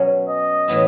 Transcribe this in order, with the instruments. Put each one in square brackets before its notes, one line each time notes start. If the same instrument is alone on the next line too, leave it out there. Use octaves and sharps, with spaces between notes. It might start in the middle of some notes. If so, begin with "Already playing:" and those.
Already playing: [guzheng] B2 F#3 C#4
[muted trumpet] D#5
[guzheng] A2 E3 B3 E4